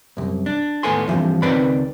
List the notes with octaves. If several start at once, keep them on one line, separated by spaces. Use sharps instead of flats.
C2 F#2
D4
D#2 A2 B3 A4 G#5 C6
G2 C3 E3 F3
C#2 D#3 C4 B4 D5 B5